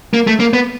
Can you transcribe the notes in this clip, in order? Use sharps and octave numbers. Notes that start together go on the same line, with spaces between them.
A#3
A3
A#3
B3